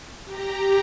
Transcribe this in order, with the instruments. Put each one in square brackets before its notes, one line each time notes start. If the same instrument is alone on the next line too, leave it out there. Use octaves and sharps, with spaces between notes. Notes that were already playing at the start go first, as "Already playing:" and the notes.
[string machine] G4 A#5